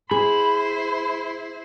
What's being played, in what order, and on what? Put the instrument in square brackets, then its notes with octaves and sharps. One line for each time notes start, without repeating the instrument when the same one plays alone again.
[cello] E4 C5 [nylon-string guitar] G#4 [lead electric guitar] B5